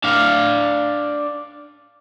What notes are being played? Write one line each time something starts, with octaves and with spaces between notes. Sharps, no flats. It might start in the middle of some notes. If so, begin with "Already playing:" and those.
D4 F5